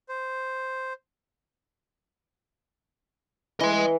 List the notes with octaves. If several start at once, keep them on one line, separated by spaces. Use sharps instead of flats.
C5
E3 D#5 C6